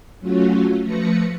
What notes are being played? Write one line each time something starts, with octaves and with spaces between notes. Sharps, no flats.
F#3 A3 C#4 F4 F#4
F3 A3 B4 A#6 C#7